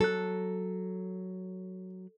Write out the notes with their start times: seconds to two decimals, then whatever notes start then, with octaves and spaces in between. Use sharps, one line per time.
0.01 F#3 A4 F#6